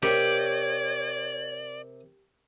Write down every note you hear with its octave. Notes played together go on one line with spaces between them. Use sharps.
C3 G4 A#4 C#5 D5 C#6